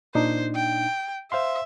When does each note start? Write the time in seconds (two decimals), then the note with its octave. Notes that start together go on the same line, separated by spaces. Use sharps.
0.15 A#2 D4 D#4 C5
0.56 G5
1.32 C5 E5 F5 C6